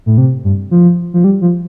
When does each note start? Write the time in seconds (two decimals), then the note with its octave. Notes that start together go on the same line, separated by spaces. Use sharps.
0.06 A2
0.18 C3
0.44 G2
0.71 F3
1.14 F3
1.24 G3
1.42 F3